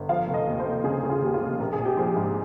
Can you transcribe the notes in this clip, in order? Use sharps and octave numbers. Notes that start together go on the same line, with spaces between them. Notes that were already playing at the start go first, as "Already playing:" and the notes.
Already playing: G1
F3 F5
F1
D#5
D#2
C5
F1
C#3 G#4
C#3
F4
D#2 G4
F4
F1
A#1 A#4
G#4
A#1
G4
F3 G#4
G#2